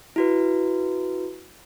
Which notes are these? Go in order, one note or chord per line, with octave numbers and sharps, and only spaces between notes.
E4 F#4 B4